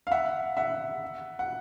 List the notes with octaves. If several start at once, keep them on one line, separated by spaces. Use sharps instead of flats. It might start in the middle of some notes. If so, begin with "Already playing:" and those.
F5
E5 F#5
E5 F#5
F#5